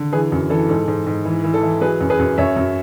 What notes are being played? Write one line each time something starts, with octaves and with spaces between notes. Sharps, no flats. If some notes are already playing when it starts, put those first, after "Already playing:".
Already playing: D3
E3 G#4 B4
F#2
E3 A4
G#2 A4
G#2
G#2
E3
E3
A4
E3
F#3 G#4 B4
F#2
G#4 B4
F#2
F#2 C#5 E5
F#2